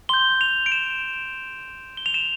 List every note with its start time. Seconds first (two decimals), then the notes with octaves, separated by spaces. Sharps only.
0.09 C6 G6 G7
0.41 F7
0.66 D7
0.72 E7
1.97 G7
2.06 F7
2.14 E7